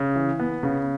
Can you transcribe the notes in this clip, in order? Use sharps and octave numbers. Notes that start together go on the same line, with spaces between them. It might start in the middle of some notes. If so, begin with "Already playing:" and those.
Already playing: C#3
E3
B3
C#3